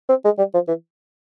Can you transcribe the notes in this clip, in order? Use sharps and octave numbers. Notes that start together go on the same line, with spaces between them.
C4
G#3
G3
F3
E3